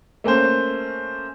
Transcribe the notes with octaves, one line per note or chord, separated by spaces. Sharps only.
A3 A#3 C#4 C5